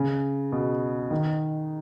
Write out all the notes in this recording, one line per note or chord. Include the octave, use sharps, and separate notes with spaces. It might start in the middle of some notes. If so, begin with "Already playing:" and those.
Already playing: C#3
B2
D#3